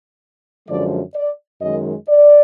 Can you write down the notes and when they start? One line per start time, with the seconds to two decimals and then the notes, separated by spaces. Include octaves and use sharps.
0.68 F#2 D3 F3 G#3 D5
1.15 D5
1.61 F#2 D#3 G#3 D#5
2.09 D5